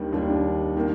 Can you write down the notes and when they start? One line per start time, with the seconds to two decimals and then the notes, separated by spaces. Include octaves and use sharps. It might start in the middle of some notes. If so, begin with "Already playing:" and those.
Already playing: D#2 D#3 G3 D4
0.13 D#2 D#3 G3 D4
0.77 D#3 A#3